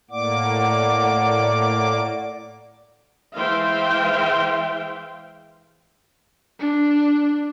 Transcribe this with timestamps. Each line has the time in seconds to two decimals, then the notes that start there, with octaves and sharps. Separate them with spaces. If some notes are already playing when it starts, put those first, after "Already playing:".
0.11 A2 A#3 D5 F#5 D6
3.37 E3 G#3 C5 E5 F5 G5
6.60 D4